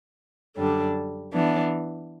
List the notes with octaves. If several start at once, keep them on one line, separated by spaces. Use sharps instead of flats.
F#2 D3 G3 D4
E3 B3 D4